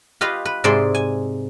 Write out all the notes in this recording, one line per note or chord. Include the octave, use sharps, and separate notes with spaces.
F4 G4 B4 D#5 F5
B4
G#2 C3 G#4 D5 E5 C6
G#5